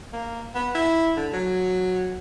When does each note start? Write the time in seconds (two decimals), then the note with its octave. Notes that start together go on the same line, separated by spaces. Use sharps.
0.13 A#3
0.55 B3
0.75 E4
1.17 D3
1.33 F#3